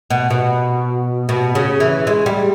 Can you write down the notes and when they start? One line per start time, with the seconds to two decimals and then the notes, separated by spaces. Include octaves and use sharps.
0.10 B2
0.30 B2
1.29 B2
1.55 C#3
1.80 E3
2.07 G#3
2.26 G3